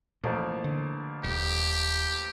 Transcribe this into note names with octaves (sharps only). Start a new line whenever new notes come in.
A1 A#2 F3 A#3
D3
D#1 G4